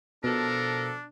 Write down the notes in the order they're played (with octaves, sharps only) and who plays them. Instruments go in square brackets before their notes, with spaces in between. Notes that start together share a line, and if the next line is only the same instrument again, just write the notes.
[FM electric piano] B2 [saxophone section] F3 A4 [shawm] D4 [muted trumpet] A#4